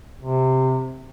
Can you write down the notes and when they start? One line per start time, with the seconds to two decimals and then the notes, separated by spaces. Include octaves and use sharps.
0.21 C3